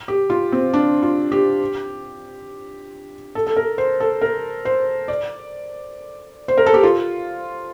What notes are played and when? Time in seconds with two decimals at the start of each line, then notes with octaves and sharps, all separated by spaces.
0.08 G4
0.30 F4
0.52 C4
0.73 D4
1.03 F4
1.32 G4
3.35 A4
3.47 A4
3.56 A#4
3.78 C5
4.00 A4
4.21 A#4
4.65 C5
5.08 D5
6.48 C5
6.58 A#4
6.66 A4
6.74 G4
6.83 F4